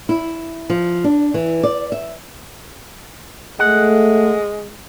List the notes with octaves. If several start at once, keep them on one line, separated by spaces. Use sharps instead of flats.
E4
F3
D4
E3
D5
E5
G#3 A3 F#5